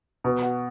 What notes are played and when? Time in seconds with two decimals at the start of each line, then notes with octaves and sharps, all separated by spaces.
0.24 B2
0.43 F#4